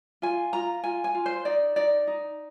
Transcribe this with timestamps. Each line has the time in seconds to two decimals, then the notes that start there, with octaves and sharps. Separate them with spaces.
0.22 F4 G#5
0.53 F4 A#5
0.84 F4 G#5
1.04 G#5
1.15 F4
1.26 C5
1.45 D#4 D5
1.76 D#4 D5
2.07 D#4